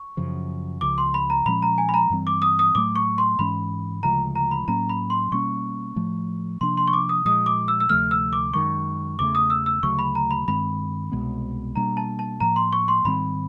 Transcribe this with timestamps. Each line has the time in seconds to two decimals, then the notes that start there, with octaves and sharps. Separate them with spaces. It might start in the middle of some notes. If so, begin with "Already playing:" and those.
Already playing: C#6
0.17 F#2 C#3 F3
0.81 C#2 C#3 F3 D6
0.98 C6
1.14 B5
1.30 A#5
1.46 A#2 F3 G#3 C#4 B5
1.62 A#5
1.78 G#5
1.89 B5
1.94 A#5
2.10 G2 E3 G3 C4
2.27 D6
2.42 D#6
2.59 D#6
2.75 A2 F#3 A3 D6
2.96 C#6
3.18 C6
3.39 G#2 E3 G#3 C#4 B5
4.03 D2 C#3 F3 G#3 A#5
4.35 A#5
4.51 B5
4.68 A2 F#3 A#3 C#4 A#5
4.89 B5
5.10 C6
5.32 B2 G3 A#3 C#4 C#6
5.96 A2 F3 A3
6.61 C3 F3 A#3 D4 C6
6.77 C6
6.88 C#6
6.93 D6
7.09 D#6
7.25 A#2 F3 G#3 D#6
7.46 D6
7.68 E6
7.80 E6
7.89 D2 C3 F3 A3 F6
8.11 E6
8.33 D6
8.54 F#2 D#3 G#3 C#6
9.19 E2 C#3 F3 A3 D6
9.35 D#6
9.50 E6
9.66 E6
9.83 D2 C#3 F#3 A3 C#6
9.99 B5
10.15 A#5
10.31 B5
10.48 G2 D#3 G#3 C4 B5
11.12 C2 B2 G#3 B3
11.76 B2 G3 A#3 D4 A#5
11.97 A5
12.19 A5
12.40 A2 F3 A#3 A#5
12.56 C6
12.73 C#6
12.88 C6
13.05 G#2 D#3 G3 C4 B5